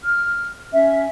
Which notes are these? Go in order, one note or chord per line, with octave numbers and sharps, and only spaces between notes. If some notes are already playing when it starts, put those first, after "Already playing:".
F6
C#4 E5